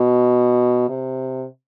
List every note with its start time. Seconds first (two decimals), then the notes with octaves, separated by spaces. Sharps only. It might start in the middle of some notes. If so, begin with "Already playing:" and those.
Already playing: B2
0.89 C3